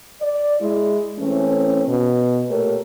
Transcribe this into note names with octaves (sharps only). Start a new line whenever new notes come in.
D5
G#3 E4
E3 A3 C4 C#4
B2
A#2 A3 G4 A#4 C#5